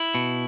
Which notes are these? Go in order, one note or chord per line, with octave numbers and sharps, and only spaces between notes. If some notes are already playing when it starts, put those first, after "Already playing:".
Already playing: E4
B2